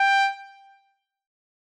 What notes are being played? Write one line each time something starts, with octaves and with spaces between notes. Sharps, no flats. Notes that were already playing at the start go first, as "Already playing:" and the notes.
Already playing: G5